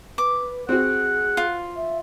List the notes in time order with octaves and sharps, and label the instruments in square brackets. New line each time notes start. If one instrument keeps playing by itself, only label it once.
[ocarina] B4 [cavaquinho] D6
[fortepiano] C4 F#4 [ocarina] G#4 [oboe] F#5
[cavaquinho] F4
[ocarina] E5